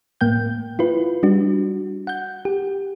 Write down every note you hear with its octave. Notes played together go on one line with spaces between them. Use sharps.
A2 A#3 G5 G6
E4 F4 B4
G3 D4 F#4
F#5 G6
G4